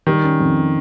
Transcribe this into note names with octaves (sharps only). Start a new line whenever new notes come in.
D#3 G3
C#4
F2